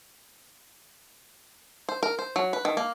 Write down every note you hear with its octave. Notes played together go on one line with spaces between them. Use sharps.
C5
A#4
C5
F#3
B4
D#3
A#3